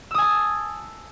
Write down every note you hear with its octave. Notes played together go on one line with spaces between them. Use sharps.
G#5 A5 D#6 E6